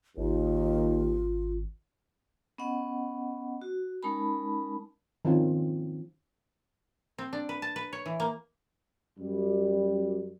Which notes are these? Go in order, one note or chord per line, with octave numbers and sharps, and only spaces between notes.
G#1 D#2 F4
B3 C#4 D#5 F#5
F#4
G#3 C#4 D#4 A#4 A5 B5
D#3 F3 C4 C#4 F4
C4
D4
B4
A5
B4
C#5
E3
A#3
F#2 G3